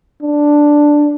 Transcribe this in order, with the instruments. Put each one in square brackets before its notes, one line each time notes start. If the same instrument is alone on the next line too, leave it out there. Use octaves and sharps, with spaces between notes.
[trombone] D4